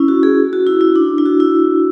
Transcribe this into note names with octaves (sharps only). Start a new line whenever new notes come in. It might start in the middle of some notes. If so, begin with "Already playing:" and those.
Already playing: C#4 E4
F#4
G#4
F#4
E4
E4
D4
E4
F#4
E4